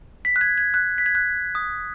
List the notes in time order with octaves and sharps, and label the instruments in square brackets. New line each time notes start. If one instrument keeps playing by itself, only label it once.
[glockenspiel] B6
F#6
G#6
G#6
F#6
B6
G#6
F#6
D#6